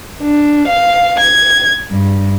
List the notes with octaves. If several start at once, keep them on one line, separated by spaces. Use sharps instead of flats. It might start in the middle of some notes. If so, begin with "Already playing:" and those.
D4
F5
G#6
G2